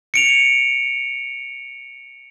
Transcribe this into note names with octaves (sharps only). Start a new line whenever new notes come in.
C#7 D7 F7